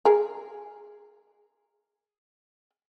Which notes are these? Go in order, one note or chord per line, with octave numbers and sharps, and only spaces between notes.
G#4 A#4